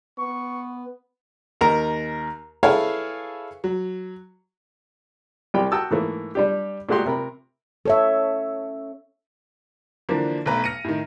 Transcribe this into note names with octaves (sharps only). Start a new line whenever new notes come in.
B3 C#6
D#2 A#4 A#5
E4 G#4 A4 B4 C#5 F5
F#3
C2 G3 G4 G5 B5
F#4 G5 A5 D#6 E6
G#2 E3 A3 A#3
G3 D4 G4
A#2 G#3 A3 F#4 G4 C6
C3 A#4 B5
C#4 A4 C#5 E5
D3 E3 F3 A#3 D4
B1 A3 B4 A#5
F6 A#6 C#7 D#7
A2 D#3